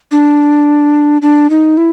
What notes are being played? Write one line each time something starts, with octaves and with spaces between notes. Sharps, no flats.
D4
D4
D#4
E4